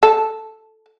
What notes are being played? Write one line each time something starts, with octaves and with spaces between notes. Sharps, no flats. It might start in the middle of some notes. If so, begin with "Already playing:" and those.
A4